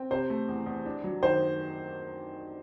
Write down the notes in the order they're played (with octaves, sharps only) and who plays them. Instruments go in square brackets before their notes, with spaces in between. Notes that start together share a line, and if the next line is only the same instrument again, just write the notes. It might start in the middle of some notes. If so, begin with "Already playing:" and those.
Already playing: [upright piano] C4
[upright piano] C3 [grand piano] C5
[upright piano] A3
E2
E2
D4
F#3
[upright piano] D#3 [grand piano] C5